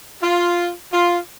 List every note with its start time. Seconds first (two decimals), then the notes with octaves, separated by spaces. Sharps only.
0.22 F4
0.92 F4